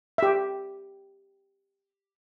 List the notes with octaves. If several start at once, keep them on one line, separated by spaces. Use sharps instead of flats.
G4 E5